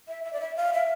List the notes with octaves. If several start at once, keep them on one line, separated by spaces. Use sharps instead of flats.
E5
E5
D5
E5
F5
E5